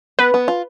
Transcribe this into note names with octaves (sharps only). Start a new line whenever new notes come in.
B3 B4
B3
F4